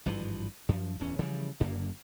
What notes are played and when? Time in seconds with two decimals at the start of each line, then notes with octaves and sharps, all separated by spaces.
0.06 G#1 G2 E3 F3
0.69 F#2 F3
1.00 D1 E2 C#4
1.19 C#3 E3 F3 G3
1.60 F#1 F#2 D3 A#3